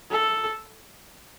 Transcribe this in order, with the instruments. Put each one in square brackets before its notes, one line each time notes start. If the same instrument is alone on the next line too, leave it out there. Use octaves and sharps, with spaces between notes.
[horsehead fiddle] A4